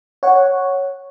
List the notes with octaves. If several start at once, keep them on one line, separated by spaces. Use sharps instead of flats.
C#5 F#5